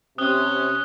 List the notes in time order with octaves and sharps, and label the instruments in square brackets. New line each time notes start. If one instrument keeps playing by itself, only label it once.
[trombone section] C3 [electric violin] C#4 [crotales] D#6 F#6 G7